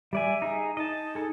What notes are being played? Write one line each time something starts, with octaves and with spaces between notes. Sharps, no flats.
G3 D5 E5 G#5
D#4 G#4
D#4 D#5 A5
G#4 A4